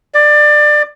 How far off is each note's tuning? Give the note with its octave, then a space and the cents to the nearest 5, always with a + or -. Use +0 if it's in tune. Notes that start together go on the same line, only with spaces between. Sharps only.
D5 +20